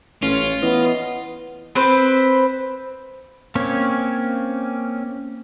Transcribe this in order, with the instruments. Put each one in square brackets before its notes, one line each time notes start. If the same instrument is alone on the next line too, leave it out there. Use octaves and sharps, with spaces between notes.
[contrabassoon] A1 [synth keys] C#4 [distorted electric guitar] F4
[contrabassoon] E3 [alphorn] B3 [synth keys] D#5
[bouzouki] C4 B4 C5
[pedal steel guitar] A#3 C4 C#4 C#5